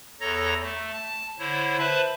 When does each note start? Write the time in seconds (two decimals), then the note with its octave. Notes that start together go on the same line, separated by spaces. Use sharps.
0.20 E2 A4 C#5 A#5 A#6
0.62 A3
0.94 A5
1.39 D3 E4 C5 C#5
1.79 B4 C5 E5 A5 B5